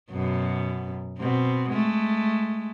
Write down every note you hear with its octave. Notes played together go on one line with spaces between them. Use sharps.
F#2 B2
B2 C4
G#3 A3